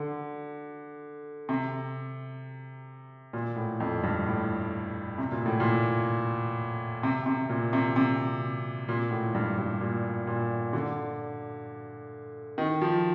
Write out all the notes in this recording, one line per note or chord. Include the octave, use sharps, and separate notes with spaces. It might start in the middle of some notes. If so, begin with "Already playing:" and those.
Already playing: D3
C3
A#2
A2
F2
G2
A2
C3
A#2
A2
A#2
C3
C3
A#2
C3
C3
A#2
A2
G2
G2
A#2
A#2
D3
D#3
F3